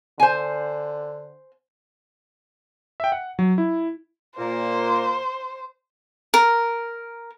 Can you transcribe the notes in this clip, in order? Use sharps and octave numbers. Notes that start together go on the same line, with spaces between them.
D3 C5 G#5
E5 G5
F#5
F#3
E4
A#2 A#3 C5
A#4